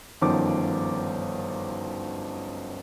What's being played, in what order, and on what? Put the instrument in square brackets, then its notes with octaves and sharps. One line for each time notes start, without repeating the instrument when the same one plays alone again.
[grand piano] G1 F#2 D#3 F3 D6